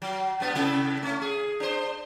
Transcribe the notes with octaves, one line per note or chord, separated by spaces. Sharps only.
F#3
F#2 B3
C3 E4 A4
A3 C#4
G#4
D4 C5